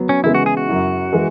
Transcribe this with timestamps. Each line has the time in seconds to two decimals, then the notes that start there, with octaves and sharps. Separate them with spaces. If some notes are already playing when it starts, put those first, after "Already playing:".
Already playing: F#3 B3
0.09 C#4
0.24 C#3 E3 G#3 B3 E4
0.35 F#4
0.46 G#4
0.57 F#4
0.69 F#2 F#3 E4
1.13 E3 G#3